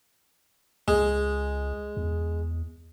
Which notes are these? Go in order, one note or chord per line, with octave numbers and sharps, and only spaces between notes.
C#2 G#3
E2